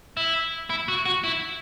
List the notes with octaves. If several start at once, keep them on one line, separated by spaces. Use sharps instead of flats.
E4
E4
F#4
F#4
E4